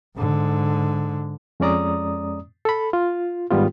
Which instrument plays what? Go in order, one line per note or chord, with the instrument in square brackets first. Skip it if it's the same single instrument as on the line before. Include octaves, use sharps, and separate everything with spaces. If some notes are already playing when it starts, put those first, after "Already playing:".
[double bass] G#2 D3
[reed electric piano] F2 G#3 C#4 D5 A#5 D#6
A4 B5
F4
G#2 D#3 G3 B3 F4